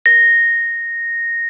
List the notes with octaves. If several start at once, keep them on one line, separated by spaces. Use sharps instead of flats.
A#6